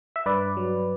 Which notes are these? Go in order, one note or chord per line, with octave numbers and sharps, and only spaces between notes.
E5
G2 B4 D5
F#3